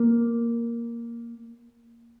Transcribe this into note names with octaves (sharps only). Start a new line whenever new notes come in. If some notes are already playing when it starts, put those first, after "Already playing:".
Already playing: A#3